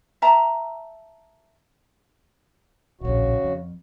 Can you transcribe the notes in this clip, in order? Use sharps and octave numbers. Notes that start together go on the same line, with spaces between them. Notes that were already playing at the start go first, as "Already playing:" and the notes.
E5 A5 A#5
D1 A#1 C#3 F#4
F2